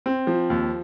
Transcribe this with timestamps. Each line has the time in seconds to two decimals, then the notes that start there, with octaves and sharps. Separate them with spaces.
0.06 C4
0.27 F3
0.50 D#2